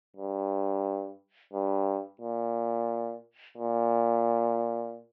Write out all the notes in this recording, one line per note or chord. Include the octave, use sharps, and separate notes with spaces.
G2
G2
A#2
A#2